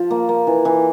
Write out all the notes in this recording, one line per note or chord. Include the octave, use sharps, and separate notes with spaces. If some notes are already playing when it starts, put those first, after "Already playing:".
Already playing: F3
A#3
A#3
E3
E3